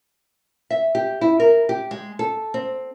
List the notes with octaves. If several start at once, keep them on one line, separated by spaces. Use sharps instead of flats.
E5
G4
E4
A#4
G4
G#3
A4
C4